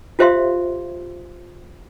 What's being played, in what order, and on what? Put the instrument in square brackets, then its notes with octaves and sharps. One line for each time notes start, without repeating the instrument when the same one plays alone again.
[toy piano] F4 G4 C5 E5 F5 C6